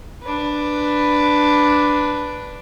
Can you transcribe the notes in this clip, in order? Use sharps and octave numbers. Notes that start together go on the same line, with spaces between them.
D4 B4